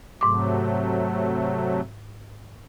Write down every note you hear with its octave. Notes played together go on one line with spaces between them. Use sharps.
G#2 C3 F#3 A3 D6